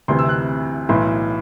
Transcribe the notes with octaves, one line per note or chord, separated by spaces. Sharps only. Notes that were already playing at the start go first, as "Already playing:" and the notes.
D2 C3 E3 C6
E6
F#6
B1 A2 E3 C6